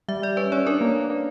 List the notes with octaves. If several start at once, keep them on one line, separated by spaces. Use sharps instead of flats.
G3 E5
G3 D5
C#4 B4
C#4 C#5
D4 A#4
A#3
A#3
A#3